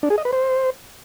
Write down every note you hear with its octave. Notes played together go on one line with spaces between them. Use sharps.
D4
G#4
D#5
B4
C5